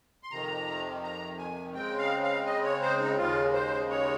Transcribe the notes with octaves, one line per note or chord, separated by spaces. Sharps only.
C6
F2 C3 D#3 A#5
A#5
G#5
C#3 G#3 C4 G5
F5
F5
D#5
C#5
C5
D#4
D#2 C#3 G#3 F4
C5
C#5